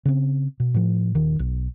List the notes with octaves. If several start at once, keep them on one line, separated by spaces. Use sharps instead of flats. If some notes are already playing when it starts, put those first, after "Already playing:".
C#3 C4
B2
A2 F3
D#1 D#3
B1